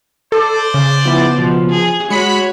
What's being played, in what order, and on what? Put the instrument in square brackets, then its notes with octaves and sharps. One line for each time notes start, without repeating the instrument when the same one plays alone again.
[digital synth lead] A4 [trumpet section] C5 D5
[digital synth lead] C#3
[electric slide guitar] F3 E4 [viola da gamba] B3
[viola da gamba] B2 [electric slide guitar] F3
[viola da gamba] G#4
[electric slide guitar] G#3 [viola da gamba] F#4 C#5 [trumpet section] B5 [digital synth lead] C#7